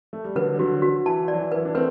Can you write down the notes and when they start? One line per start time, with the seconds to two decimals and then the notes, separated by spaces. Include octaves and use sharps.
0.13 A3
0.24 G3
0.35 D3 F#3 B4
0.54 G3
0.59 D3 F#3 F#4
0.82 F#4
1.06 E3 A5
1.28 D5
1.33 F#3
1.40 E3
1.52 E4 B4
1.65 D4
1.75 A3 C4 B4